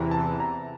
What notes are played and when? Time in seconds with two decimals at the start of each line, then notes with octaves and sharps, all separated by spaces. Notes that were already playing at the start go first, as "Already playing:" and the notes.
Already playing: E2 C3 E3 A#5
0.11 A5
0.40 A#5